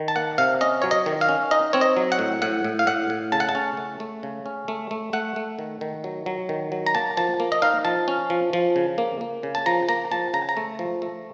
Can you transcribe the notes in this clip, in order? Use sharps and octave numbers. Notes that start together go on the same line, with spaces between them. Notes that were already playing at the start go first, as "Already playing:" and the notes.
Already playing: D#3
A5
A#3 F#5
C3 F5
C#4 D#5
F#3 C#5
D#5
D#3
F5
C#4
D#4 D#5
C4 C#5
D#5
F#3
F#5
A2
A2 F#5
A2
F5
A2 F#5
A2
C#3 A5
F#5
A5
C#4
A3
A3
C#3
C#4
A3
A3
A3 F#5
A3
D#3
D#3
F#3
F#3
D#3
F#3
A#5
A#3 A5
F3 A5
A#3
D#5
D#4 F5
F3 A5
C#4
F3
F3
C#3
A#3
A#3
C#3
A5
F3 A#5
A#3 A#5
F3 A5
C#3 A#5
A#5
A3
F3
A3